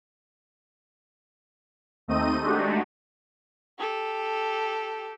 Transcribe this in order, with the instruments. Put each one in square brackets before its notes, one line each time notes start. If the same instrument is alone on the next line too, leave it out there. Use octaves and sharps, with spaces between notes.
[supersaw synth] D#2 A3 C4 D#4 D#5 D#7
G#3 A3 D4 D#4 F#4 G4
[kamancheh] G4 A4